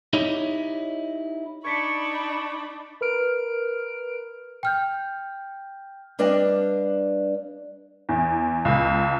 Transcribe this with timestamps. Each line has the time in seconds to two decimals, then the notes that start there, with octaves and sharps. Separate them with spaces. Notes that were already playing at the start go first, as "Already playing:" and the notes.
0.13 D#4 E4 G4 C#5 D#5
1.64 D4 D#4 B5 C#6 G#6 B6 C#7
3.01 A#4 B4 F6 D7
4.63 G5 F6 G6
6.19 G3 D4 B4 D#5 F5
8.09 E2
8.65 C#2